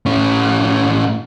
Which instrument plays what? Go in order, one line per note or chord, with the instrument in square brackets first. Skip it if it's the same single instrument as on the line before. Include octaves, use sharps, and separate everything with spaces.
[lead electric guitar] A2 C#4